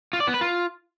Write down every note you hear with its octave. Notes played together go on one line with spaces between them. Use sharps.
F4
D5
B3
B4
F4